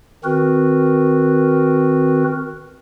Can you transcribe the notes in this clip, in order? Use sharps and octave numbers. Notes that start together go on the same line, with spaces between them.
D#3 C4 F#4 A#4 B4